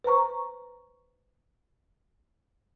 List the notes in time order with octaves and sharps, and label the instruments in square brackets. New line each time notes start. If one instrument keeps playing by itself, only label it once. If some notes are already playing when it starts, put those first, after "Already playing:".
[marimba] B4 C5 A#5 C#6